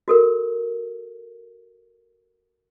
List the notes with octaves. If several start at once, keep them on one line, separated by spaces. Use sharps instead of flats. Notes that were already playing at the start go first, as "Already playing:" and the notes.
F#4 A4 A#4